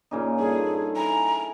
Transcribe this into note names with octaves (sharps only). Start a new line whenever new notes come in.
A#2 C#3 D#4
G2 G#4 A4
E4 G#5 A#5